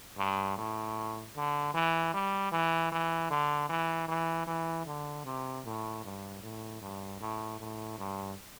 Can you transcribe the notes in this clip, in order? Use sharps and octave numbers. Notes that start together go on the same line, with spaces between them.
G2
A2
D3
E3
G3
E3
E3
D3
E3
E3
E3
D3
C3
A2
G2
A2
G2
A2
A2
G2